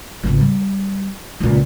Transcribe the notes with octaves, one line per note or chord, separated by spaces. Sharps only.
G#1 C#2
G3
C#2 A#2